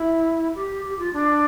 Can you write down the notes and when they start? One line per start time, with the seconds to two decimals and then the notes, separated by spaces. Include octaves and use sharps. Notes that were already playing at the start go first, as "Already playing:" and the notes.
Already playing: E4
0.55 G4
0.85 G4
0.98 F4
1.13 D4